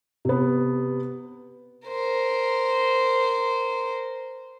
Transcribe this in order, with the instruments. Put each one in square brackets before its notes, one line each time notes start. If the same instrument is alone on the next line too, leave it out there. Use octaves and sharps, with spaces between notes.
[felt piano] C3 B3
[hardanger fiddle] A#4 C5